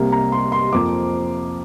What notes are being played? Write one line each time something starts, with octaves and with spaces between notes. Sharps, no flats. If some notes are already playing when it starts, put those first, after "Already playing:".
Already playing: C2 C3 A#3
A#5
C6
C6
F2 F3 A#3 D6